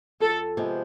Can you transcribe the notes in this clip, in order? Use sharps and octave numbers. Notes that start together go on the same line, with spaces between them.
F2 A4
C3 F3 G#3 B3